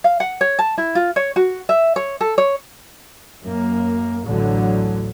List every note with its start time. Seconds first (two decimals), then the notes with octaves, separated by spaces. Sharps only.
0.04 F5
0.20 F#5
0.41 C#5
0.59 A5
0.78 E4
0.95 F4
1.16 C#5
1.36 F#4
1.69 E5
1.96 C#5
2.21 A4
2.38 C#5
3.44 F#2 A#3
4.24 A1 D2 D3 F#3